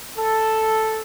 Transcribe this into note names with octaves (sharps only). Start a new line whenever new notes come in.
A4